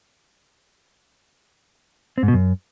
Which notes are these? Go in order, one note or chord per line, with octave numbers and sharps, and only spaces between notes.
C4
G#2
B2
F#2